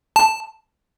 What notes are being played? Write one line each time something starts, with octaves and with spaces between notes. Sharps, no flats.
A5